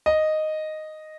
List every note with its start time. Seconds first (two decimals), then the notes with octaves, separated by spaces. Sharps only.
0.06 D#5